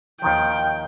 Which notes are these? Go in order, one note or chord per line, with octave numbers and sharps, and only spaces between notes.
D#2 D#3 F3 G5